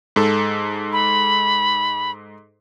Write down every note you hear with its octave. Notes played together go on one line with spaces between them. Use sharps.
G#2 A4
B5